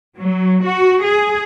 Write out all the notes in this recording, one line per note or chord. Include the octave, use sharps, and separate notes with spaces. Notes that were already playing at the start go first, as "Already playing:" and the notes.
F#3
F#4
G#4